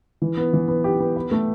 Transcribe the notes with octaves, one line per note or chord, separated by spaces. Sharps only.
E3
B3
E3
B3
G4
B3
B4
A3